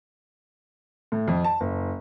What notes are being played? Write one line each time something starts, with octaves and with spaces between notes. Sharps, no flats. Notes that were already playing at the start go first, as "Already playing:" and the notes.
A2
F2
A5
F#1